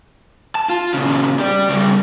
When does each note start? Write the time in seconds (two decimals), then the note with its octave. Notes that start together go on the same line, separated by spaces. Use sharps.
0.55 A5
0.69 F4
0.94 A#2 C#3
1.39 G4 D5
1.69 C#3 G3